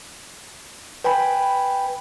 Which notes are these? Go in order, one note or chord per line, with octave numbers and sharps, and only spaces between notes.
B4 G5 G#5 B5